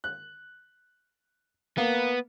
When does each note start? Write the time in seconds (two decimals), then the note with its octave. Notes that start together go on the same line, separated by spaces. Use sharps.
0.04 F#6
1.78 A#3 B3